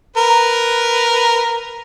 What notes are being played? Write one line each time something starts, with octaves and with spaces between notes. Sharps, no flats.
A#4 B4